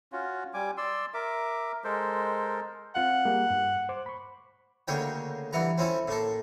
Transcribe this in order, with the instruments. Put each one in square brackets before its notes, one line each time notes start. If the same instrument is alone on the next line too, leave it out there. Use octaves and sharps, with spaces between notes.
[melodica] C#4 F4 F#4
G3 G#5 D6
D5 C6 E6
A#4 E5 D6
G#3 A4 A#4 C5
[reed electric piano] C4 F4 F5 [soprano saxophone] F#5
[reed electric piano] G3 A#3 G#4
G2
C5 D6
B5 C#6
[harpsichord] D2 C#3 A#3 C#5 G5
G2 E3 F#5 A#5
C4 C#4 E4 A4
A2 A#3 A4